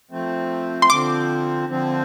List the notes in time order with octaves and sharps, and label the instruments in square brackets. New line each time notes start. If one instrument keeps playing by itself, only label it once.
[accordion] F3 A3 C4
[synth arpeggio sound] C6
[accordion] D3 F3 C4 [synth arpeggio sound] D6
[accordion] D3 F3 C4